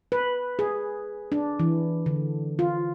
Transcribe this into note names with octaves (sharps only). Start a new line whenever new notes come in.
B4
G#4
D4
E3
D3
F4